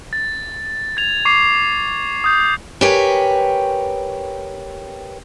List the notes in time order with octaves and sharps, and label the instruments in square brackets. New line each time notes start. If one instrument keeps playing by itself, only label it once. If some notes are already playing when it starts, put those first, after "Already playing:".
[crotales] A6
G#6 A6 F7
C#6 D6 C7 F7
D#6 G6
[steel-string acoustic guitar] G4 A#4 B4 C#5 G5 G#5